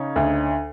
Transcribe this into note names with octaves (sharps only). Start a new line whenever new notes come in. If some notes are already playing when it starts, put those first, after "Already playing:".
Already playing: C#3 C#4 D#4
D2